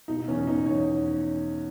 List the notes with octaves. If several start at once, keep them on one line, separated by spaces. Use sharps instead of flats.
B2 D#4
E2 C#4
E2 D#4
E2 C#5